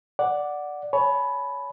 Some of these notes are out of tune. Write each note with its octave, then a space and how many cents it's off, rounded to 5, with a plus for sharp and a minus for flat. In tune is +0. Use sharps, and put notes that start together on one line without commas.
D5 +0 F#5 +0
C#5 +15 G#5 +40 B5 +0